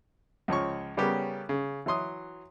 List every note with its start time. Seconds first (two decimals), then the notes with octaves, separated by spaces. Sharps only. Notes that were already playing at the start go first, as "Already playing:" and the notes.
0.48 C#2 F3 C#5 C#6
0.97 C#3 G3 B3 C#4 G4 A#4
1.49 C#3
1.86 E3 F#3 C6 D#6